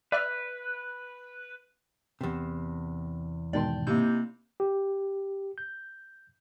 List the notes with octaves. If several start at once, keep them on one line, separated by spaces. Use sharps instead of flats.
B4 D5 E5 F6
E2 C3
G#2 B2 D#3 D5 G5 A5 C6
C3 A#3 D#4 E4 G6
G4
G6